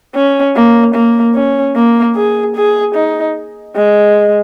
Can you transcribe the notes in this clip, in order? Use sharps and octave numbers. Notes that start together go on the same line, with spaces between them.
C#4
A#3
A#3
C#4
A#3
G#4
G#4
D#4
G#3